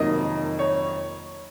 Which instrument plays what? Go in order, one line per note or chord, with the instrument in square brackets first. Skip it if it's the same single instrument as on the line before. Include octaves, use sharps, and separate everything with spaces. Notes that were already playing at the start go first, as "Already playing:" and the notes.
Already playing: [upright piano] F2 C3 D#3 F#3 A#3 D#5
C#5